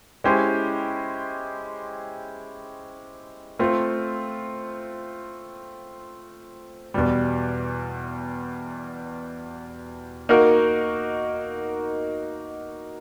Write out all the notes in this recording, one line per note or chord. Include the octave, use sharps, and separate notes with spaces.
G#3 C#4 E4 G4 C5
A3 C4 F4
E2 B2 G3
A#3 D#4 F#4 A#4